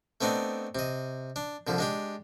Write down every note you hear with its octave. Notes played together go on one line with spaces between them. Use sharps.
A3 B3 C4 D4 D#4
C3 D#5
D4
C2 D3 F3
G#3 D4 G4